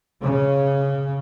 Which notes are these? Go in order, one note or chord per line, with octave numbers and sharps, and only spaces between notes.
C#3